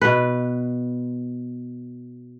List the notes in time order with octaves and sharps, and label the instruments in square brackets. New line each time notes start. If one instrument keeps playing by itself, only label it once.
[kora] B2 B4